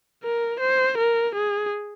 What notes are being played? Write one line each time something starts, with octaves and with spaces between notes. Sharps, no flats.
A#4
C5
A#4
G#4